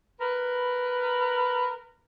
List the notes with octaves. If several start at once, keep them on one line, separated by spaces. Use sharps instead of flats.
A#4 B4